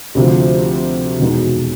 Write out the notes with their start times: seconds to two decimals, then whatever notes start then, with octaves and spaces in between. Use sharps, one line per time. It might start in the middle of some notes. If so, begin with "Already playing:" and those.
0.15 D2 C3 F3
1.20 E2 B2 G#3 B3 D#4